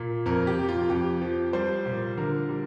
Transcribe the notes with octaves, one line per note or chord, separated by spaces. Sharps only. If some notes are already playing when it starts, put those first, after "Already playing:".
Already playing: A#2
F2 A#4
G4
F2
F4
F2 G4
F3
G3 C5
A#2
D3 A#4
G3